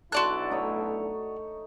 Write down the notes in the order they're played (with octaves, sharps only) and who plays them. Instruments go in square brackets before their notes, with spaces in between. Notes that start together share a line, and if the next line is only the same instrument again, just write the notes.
[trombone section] B1 D4 E4 [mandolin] F#4 D5 F#6 [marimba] A5 C6
[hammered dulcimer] A3 D#4 C#5